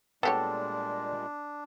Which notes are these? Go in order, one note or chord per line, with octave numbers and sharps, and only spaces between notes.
A#2 G3 G#3 B3 D4 G4 A4 C#5